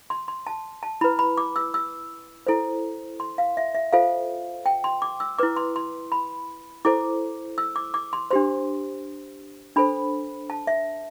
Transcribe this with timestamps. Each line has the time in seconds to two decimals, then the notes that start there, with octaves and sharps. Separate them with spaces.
0.10 C6
0.28 C6
0.47 A5
0.83 A5
1.01 E4 B4 B5
1.19 B5
1.38 D6
1.56 E6
1.74 E6
2.47 E4 A4 C5
3.20 C6
3.38 F5
3.57 E5
3.75 E5
3.93 F4 A4 C5 F5
4.66 G5
4.84 C6
5.02 D6
5.20 E6
5.38 E4 B4 D6
5.57 C6
5.76 C6
6.12 B5
6.85 E4 A4 C5 D6
7.58 E6
7.76 D6
7.94 D6
8.13 C6
8.31 D4 G4 C5 C6
9.76 D4 A4 C5 B5
10.50 A5
10.67 E5